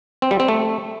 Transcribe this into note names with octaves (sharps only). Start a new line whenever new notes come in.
C4
G3
C4
A3